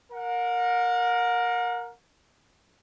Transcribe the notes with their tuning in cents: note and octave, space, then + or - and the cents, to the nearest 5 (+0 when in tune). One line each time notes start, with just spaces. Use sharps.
A#4 +0 F#5 -40